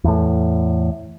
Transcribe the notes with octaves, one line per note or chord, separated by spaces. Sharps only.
E2 A2